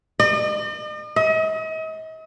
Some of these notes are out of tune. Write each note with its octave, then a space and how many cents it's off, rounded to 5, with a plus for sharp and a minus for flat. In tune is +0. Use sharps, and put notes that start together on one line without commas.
D#5 -45
D#5 +40